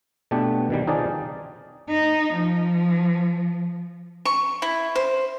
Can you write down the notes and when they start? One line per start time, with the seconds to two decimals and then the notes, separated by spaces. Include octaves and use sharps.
0.31 B2 A3 B3 D4 G4
0.70 B2 D#3 G3
0.87 C4 D#4 F4 G#4 D5 A5
1.89 D#4
2.34 F3
4.25 C#6
4.62 E4
4.95 C5